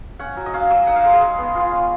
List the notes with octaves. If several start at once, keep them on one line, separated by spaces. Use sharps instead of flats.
C#4 F#5
F#3
D#5
C#4 F5
F#3
D#4 F#5
F5
G#3 D#5
G#4
G#3
B3
F4
C#4